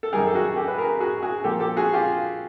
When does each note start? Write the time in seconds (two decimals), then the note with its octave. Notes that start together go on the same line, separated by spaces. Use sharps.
0.03 A4
0.13 F#2 D#3 G3 G#4 A#4
0.27 A4
0.34 F#4 G#4
0.56 G4 A4
0.68 B4
0.78 G#4 A#4
1.00 F#4 G#4
1.22 F#4 G#4
1.44 A#2 F3 A#3 G4 A4
1.60 G4 A4
1.77 F#4 G#4
1.94 F4 G4